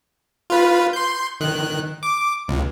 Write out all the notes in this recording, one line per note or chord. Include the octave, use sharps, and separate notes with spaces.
F4 B4
C6 G6
D#3 F#6
D6
C#2